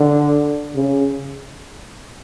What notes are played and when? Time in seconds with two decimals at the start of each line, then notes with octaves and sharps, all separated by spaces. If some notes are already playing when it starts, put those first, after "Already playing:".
Already playing: D3
0.75 C#3